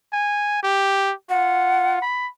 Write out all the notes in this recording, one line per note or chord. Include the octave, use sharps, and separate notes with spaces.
G#5
G4
F4 F#5
B5